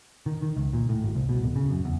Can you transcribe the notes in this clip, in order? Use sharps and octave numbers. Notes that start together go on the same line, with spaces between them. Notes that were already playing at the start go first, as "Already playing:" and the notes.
D#3
D#3
C#2
A#2
A2
G#1
C2
B2
D1
C#3
F#2
E2